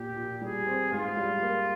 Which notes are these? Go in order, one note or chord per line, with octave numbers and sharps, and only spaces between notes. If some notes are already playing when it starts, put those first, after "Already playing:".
Already playing: A#2 G4
A#2
G3 G#4
C4
G#2 F4
G3
A#3